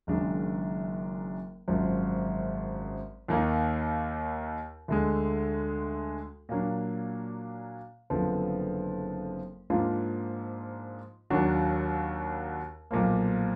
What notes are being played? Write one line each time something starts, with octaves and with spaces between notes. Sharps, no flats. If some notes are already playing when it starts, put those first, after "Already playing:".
F#1 F#2 D#3 G#3 D4
G#1 F#2 F3
D#2 D#3 A#3 D#4
D2 D3 G#3
A#2 F#3 A#3 D4
F#1 F2 D3 F3 B3
G#2 F3 A#3 D4 F4
D#2 D#3 F#3 D4 F#4
B1 A#2 F3 A#3